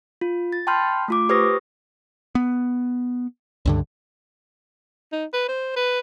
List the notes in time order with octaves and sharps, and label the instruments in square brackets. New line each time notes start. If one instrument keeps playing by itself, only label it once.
[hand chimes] F4
A6
G5 A5 B5 C6 F6 G6
A3 F4 D6
G4 B4 C5 C#6 D#6 A#6
[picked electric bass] B3
C#2 G2 D3
[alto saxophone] D#4
B4
C5
B4